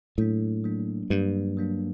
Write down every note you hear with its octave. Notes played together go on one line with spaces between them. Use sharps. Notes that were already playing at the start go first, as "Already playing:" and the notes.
A2 F#3 A#3 D4
F#3 A#3 D4
G2 F#3 A#3 D4
F#3 A#3 D4